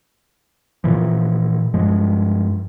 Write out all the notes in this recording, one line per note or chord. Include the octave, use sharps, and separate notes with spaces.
A#2 E3 F3
G2 F3 G#3